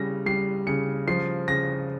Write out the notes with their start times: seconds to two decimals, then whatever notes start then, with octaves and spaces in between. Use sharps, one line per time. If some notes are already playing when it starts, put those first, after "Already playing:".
Already playing: C#3 G3 A#6
0.26 G3 C7
0.67 C#3 C#7
1.08 F3 C7
1.48 C#3 A#6